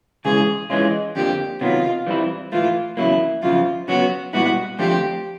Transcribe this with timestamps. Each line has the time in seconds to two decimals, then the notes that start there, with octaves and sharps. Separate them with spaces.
0.25 C#3 E3 G#3 G#4
0.70 E3 G#3 C#4 F4 G#4
1.15 F2 D3 F3 A#3 G4
1.61 C3 D#3 F#3 B3 F4
2.07 E3 G3 C4 E4
2.52 A2 E3 A3 F4
2.97 E2 C#3 F#3 A#3 E4
3.42 F#2 C#3 F3 F4
3.88 C#3 F#3 B3 F#4
4.33 A#2 G3 B3 E4 F#4
4.79 D3 F3 A3 C4 F4 G4